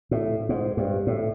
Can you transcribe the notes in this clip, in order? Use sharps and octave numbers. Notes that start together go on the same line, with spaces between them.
A2
G#2
G2
A2